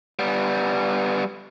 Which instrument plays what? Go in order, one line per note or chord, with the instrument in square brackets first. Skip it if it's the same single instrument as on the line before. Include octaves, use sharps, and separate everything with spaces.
[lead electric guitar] G3 B3